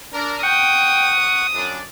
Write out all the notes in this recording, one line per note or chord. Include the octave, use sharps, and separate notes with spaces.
D4 A#4
F#5 G5 C#6 D#6
F#2 D4 D5